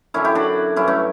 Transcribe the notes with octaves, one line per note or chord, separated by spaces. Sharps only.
F#2 D3 F#3 C#4 E4
E4 G4
D4 F#4
G2 F#3 C#4 E4
A3 C#4